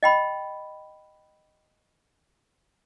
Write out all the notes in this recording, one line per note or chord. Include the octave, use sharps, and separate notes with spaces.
D#5 G5 B5